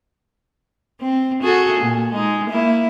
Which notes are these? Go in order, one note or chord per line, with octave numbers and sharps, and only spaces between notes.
C4
F#4 G#4 A4
A#2
G#3 D#4
A#3 E4